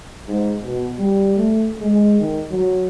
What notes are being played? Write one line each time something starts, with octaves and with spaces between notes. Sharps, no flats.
G#2
B2
G3
A3
G#3
D#3
F#3